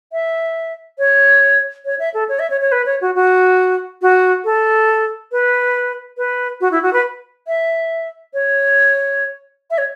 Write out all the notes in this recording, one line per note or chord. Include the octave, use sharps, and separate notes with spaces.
E5
C#5
C#5
E5
A4
C#5
E5
C#5
C#5
B4
C#5
F#4
F#4
F#4
A4
B4
B4
F#4
E4
F#4
B4
E5
C#5
E5
C#5